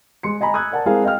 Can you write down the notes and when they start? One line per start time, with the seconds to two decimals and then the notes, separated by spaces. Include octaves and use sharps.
0.23 G#3 C6 C#7
0.41 D#5 G#5 A#5 B5
0.54 D#6 E6 F#6 G#6
0.71 A#4 D5 F#5 A5
0.86 G#3 C4 E4 G#4 A#4 F5
1.04 D#5 F5 G5 F6